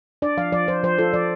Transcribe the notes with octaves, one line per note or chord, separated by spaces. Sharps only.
D4 D5
F3 F5
F3 D5
F3 C5
F3 C5
F4 A4
F3 D5